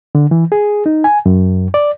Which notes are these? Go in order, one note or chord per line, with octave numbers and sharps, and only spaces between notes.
D3
E3
G#4
D#4
G#5
F#2
D5